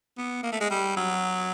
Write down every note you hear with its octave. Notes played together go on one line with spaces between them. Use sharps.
B3
A#3
A3
G#3
G3
F#3